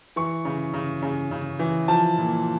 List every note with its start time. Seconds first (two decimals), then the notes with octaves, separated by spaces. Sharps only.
0.16 E3 C#6
0.45 C#3
0.74 C#3
1.02 C#3
1.31 C#3
1.59 E3
1.88 F3 A5
2.18 A#2